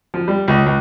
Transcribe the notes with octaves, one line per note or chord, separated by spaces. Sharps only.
F3
G3
C#2
C#2